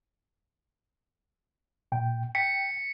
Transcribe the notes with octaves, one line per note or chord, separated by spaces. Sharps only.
A#2 G5
G5 B6 C#7